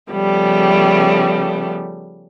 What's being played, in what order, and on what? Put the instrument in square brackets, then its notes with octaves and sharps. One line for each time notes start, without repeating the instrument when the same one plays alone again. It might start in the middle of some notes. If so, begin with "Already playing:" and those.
[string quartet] C#3 F3 G3 A3 B3